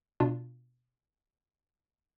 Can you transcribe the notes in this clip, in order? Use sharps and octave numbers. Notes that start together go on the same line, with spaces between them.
B2 D4 F4